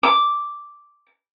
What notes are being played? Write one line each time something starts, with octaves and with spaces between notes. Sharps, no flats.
D6